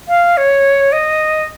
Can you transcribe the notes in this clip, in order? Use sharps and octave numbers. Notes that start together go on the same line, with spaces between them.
F5
C#5
D#5